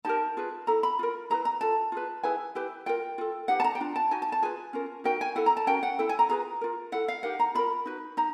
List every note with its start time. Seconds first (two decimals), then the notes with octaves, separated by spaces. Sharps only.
0.05 D#4 G4 A#4 A5
0.37 F4 G#4 B4
0.67 E4 A4 A#5
0.83 B5
0.99 F4 A#4
1.30 E4 G#4 B4 A#5
1.45 A#5
1.61 F4 A4 A5
1.92 F4 G#4 B4
2.23 E4 G#4 B4 G#5
2.55 E4 G4 B4
2.86 F4 A#4 G5
3.18 F4 A4
3.48 D#4 G4 B4 F#5
3.60 A5
3.64 A#5
3.75 G5
3.81 D4 F4
3.96 A5
4.11 D#4 F#4 G#5
4.22 A5
4.32 A5
4.42 F4 G#4 B4 G#5
4.73 C#4 F4 A#4
5.04 D#4 F#4 A#4 G5
5.21 G#5
5.36 E4 A4 F#5
5.46 A#5
5.57 A5
5.67 C#4 F#4 A#4 G5
5.83 F#5
5.99 E4 A4 G5
6.09 G#5
6.19 A#5
6.29 F4 G#4 B4 A#5
6.61 F4 A#4
6.92 E4 A4 F#5
7.08 F5
7.23 D#4 G4 A#4 F#5
7.40 A#5
7.55 F4 A#4 B5
7.85 D#4 F#4 B4
8.17 D#4 A#5